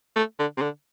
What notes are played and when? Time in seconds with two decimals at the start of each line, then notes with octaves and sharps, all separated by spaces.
0.16 A3
0.39 D3
0.57 C3
0.62 D3